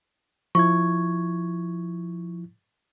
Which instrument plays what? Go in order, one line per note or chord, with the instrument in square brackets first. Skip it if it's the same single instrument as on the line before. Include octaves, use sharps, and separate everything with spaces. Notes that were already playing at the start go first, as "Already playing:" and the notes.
[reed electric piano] F3 E4 G#6 [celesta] C#6